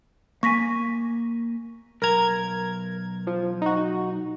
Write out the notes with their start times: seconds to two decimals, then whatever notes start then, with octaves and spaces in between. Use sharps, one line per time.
0.43 A#3 G#5 C#6 A#6 B6
2.02 B1 A#4 A#5 G#6
3.27 F3
3.62 D#4 F#4